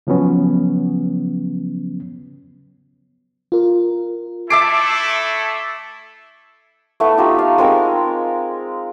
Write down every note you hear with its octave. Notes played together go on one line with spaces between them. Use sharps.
C#3 F3 F#3 B3 C#4
F4 A#4
A3 E4 A4 E5 A5 D6 E6 C7
A3 B3 E4
D#4 F4 G4 E5
F5
G#3 C4 D#4 A#4